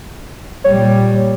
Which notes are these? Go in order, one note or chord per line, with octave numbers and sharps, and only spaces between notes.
A#2 G3 C#5